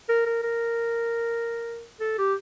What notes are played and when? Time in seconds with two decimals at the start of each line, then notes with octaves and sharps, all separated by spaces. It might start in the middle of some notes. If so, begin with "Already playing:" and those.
0.09 A#4
0.26 A#4
0.44 A#4
2.00 A4
2.18 G4